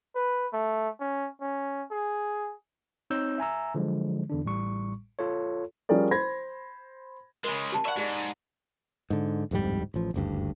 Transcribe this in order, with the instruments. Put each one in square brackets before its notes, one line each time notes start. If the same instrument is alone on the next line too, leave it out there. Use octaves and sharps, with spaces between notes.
[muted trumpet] B4
A3
C#4
C#4
G#4
[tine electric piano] C4 D#4 C#5 E6 G6
E5 G#5 A#5 E6
D3 F3 F#3 G#3
E2 D3 D4
A1 A2 G3 C#6
F4 A4 C#5
[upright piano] F3 G3 C#4 G#4 A#4 D5
C5 B5 G#6 A#6
[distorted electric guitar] C#3 G#3 [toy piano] A#4 B5
[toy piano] G4 A5
[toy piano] D5 B5 C#6 [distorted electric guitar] E5 F#5
[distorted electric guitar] G#2 [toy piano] G4 G#4 D5
[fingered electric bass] G#2 D3
D1 F2 G#2 G3
A1 F3
F#1 D2 G2